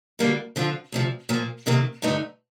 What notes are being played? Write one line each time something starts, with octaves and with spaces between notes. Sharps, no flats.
D2 D3 G3 A#3 D#4
D3 F3 C4 F4
D2 C3 F3
A#2 F3 A#3
F2 C3 D#3 A#3
G2 D3 A3 D#4